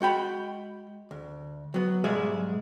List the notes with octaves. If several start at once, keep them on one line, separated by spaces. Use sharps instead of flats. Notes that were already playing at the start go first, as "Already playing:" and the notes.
G#3 F#4 G5 B5
D2
F#3 B3
B1 G#2 G3 G#3 G#4 E5